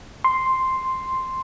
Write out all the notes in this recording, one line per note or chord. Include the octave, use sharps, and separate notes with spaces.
C6